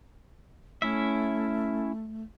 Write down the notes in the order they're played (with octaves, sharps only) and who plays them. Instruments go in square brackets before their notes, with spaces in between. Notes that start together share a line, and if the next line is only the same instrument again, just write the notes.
[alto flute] A3 [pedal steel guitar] C#4 E4 E5